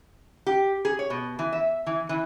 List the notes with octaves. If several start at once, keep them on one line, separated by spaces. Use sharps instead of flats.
G4
G#4
C#5
B2
E3
E5
E3
E3